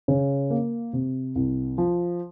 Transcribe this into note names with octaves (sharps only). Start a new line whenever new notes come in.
C#3
A#3
C3
C2
F3